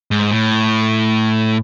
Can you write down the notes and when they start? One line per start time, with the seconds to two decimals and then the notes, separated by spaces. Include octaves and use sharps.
0.11 G#2
0.31 A2